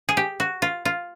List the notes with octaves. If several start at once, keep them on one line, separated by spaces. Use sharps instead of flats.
G#4
G4
F#4
F4
F4